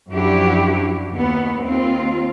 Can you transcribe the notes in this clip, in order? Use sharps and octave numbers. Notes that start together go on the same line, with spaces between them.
F#2 F3 D4 E4 F#4 G4
D#2 B3
D#2 C4 F4